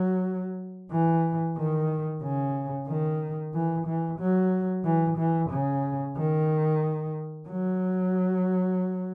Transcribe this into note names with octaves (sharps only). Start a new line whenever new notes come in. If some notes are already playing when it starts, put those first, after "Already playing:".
Already playing: F#3
E3
D#3
C#3
D#3
E3
E3
F#3
E3
E3
C#3
D#3
F#3